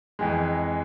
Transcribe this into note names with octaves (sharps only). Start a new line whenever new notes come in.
F2 E3 G#3